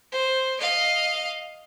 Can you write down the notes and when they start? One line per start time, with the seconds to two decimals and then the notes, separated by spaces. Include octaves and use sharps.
0.12 C5
0.60 D#5 F5